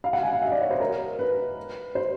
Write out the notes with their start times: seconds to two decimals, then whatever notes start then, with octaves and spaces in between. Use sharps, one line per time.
0.04 F5
0.13 F#5
0.23 G#5
0.33 F5
0.42 E5
0.47 D#5
0.52 D5
0.61 C#5
0.71 C5
0.80 A#4
1.19 B4
1.95 C5